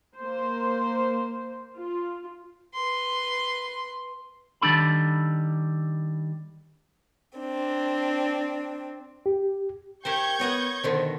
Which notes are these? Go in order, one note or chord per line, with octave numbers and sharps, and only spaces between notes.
A#3 C5
F4
B4 C6
D#3 G3 D4 A4 B5
C4 D4
G4
G4 A#4 C5 G5 C#6 G6 G#6
B3 C#5 D#5 F#5
B2 D3 D#3 C5